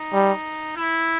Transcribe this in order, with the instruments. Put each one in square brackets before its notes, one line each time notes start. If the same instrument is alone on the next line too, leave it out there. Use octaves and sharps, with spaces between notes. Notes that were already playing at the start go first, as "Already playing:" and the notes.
Already playing: [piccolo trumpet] D#4
[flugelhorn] G3
[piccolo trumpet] E4